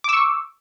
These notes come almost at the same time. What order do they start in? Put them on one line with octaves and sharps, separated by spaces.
D6 E6 C#6